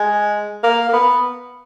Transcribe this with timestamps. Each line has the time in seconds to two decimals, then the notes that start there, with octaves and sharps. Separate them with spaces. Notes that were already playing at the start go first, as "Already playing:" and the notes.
Already playing: G#3
0.64 A#3
0.89 A#3
0.93 B3